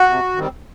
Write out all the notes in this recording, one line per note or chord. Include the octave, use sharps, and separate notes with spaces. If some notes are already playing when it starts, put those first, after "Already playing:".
Already playing: F#4
C3
D#3 G3 C4